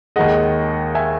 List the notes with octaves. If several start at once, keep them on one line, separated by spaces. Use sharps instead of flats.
D#2 D#3 G#3 D#5 F#5
E5 G#5